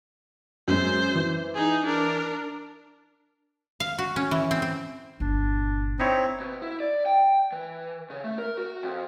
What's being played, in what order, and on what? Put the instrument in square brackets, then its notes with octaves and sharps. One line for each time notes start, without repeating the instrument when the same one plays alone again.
[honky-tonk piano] F#2 G#3 [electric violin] C5
[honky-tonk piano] E3
[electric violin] D#4 G#4
D4 A#4
[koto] F5
F#4
C#4
E3
C4
C4
[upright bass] G1 A#2 [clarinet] D4
[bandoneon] C4 [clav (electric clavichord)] D#4 E4 C#5
[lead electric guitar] B2
E4
D5
G5
E3
C#3
A3
A#4
F#4
F2